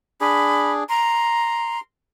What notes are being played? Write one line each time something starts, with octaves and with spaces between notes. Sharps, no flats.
D4 G#4 B5
A#5 C6